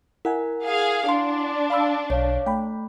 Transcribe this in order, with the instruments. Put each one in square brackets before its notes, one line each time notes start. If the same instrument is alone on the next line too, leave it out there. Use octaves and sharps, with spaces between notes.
[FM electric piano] E4 F#5 G#5 [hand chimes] A#4
[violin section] G#4 F5
[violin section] D4 [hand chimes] C6
[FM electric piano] F5 B5 E6
[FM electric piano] B1 [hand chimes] C#5 F5
[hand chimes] A3 [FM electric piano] G5 B5